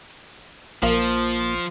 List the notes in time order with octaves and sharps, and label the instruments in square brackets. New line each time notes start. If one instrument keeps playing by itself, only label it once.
[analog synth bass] A#1 [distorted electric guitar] F3 [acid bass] A#3